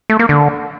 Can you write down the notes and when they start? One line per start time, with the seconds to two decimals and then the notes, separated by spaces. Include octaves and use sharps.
0.10 A3
0.19 A#3
0.29 D3